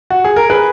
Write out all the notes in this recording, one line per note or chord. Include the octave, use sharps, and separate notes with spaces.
F#4
G#4
A#4
G#4 B4